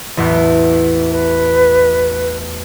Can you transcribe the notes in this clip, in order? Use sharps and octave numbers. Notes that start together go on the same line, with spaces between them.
A1 E2
B4